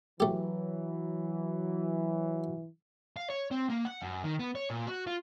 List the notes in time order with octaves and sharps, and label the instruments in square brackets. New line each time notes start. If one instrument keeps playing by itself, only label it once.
[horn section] E3 [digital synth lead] F#3 [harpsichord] A3 G4
[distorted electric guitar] F5
C#5
C4
A#3
F#5
F#2
D#3
B3
C#5
A#2
F#4
F4